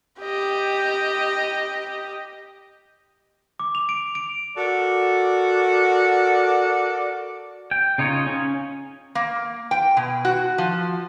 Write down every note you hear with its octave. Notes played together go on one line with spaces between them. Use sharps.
G4 D#5
D6
F7
D7
D7
F#4 A4 A#4 D5
G5
C#3 D#4 F4 C#5 D#5
C#4
A#3
G5
B2
F#4
F3